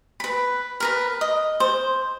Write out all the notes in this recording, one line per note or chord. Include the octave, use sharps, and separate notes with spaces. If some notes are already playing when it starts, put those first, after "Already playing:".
B4 B5
A#4 B4 A#5
D#5
C5